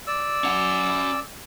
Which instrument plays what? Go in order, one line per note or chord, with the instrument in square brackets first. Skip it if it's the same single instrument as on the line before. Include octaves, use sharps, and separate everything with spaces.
[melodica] D5 E6
[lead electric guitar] C#4 F#5